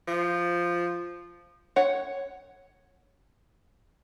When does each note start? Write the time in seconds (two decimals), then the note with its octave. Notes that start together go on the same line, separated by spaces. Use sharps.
0.08 F3
1.76 C#5 F#5